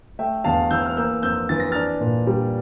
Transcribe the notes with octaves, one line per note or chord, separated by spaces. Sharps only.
A3 E5 G5
E2 F5 A5
E3 E6 G6
F6
A#3 E6 G6
F2 E6 G6
E3 A6
A#6
D4 F6 A6
A#2
G3